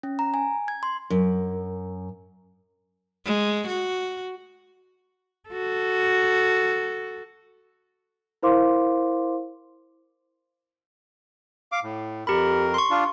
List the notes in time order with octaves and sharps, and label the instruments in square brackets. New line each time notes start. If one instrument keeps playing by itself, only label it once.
[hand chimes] C#4
A#5
G#5
G#6
C6
[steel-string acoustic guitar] F#2
[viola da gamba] G#3
F#4
[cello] F#4 A4
[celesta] E4 A#4 C5 F5 C6 D6
[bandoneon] F5 D6
A2
[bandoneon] F2 A#4 [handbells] G4 B5
[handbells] C6 C#6
[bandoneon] D4 F4